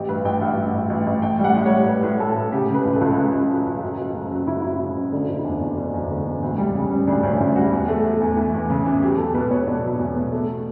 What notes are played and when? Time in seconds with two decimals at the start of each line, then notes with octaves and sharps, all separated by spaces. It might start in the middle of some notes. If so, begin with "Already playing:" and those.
Already playing: A1 G4
0.09 G2 B4
0.25 A1 G5
0.41 G2 F#5
0.57 G2
0.74 A1
0.90 A1
1.07 A1
1.22 A1 G5
1.39 G3
1.44 F#5
1.55 A2
1.66 G3 C#5
1.87 A2 B4
2.03 A2
2.19 A2 A4
2.36 A2
2.52 C#3 G4
2.69 C#3
2.74 B4
2.85 C#2
2.96 A4
3.01 C#2
3.17 C#3
3.34 C#2
3.50 F#3
3.66 C#2
3.83 F#2
3.99 F#1
4.15 C#3
4.31 F#3
4.47 C#3 E4
4.54 F#4
4.62 F#3 E4
4.80 C#3
4.97 F#1
5.12 D3 D4
5.29 F#1
5.39 E4
5.44 E2 D4
5.61 E2
5.77 F#1 D4
5.94 E2
6.10 D3
6.26 E2
6.43 D2
6.58 G3
6.74 C#3
6.91 G3
7.07 D2 D4
7.23 D2 C#4
7.39 D2 E4
7.55 G3 F#4
7.72 E2
7.88 A3
8.05 A3
8.21 E2
8.37 E3
8.54 E2
8.70 C#3
8.86 E3
9.02 F#3 G4
9.18 E2 A4
9.34 B2 B4
9.51 B2 C#5
9.67 B2 D5
9.84 F#3
9.99 E2
10.16 B2
10.32 A3